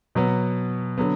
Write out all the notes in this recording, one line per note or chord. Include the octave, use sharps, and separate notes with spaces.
B2 F#3 B3
D3 F#3 B3